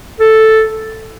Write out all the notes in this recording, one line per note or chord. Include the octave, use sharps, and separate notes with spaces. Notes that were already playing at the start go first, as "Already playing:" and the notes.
A4